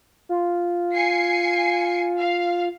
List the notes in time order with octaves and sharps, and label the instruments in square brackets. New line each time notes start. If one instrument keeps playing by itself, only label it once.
[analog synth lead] F4
[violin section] G#5 C7 C#7
F5